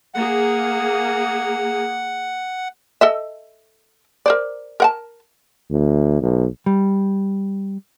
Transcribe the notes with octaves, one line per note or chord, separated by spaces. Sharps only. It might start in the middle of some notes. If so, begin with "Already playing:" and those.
A#3 G#4 F#5
A4 D#5 E5
A#4 C5 D5
A#4 F#5 A5
D2
B1
G3